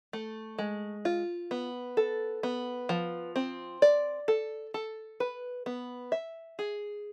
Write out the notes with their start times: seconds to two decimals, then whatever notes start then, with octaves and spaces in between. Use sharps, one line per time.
0.13 A3
0.59 G#3
1.05 F4
1.51 B3
1.97 A4
2.43 B3
2.89 F3
3.36 C4
3.82 D5
4.28 A4
4.74 A4
5.20 B4
5.66 B3
6.12 E5
6.59 G#4